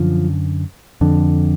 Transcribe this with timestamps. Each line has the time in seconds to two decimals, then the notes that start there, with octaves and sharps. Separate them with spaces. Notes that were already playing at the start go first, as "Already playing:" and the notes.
Already playing: F#2 D3 F3
1.01 F2 D3